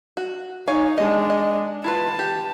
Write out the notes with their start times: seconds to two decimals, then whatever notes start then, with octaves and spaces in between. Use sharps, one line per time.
0.17 F#4
0.68 D#4 C#5 F5 G#5
0.98 G#3 D4 D#5
1.30 D#5
1.84 E4 F4 B4 A5
2.19 G4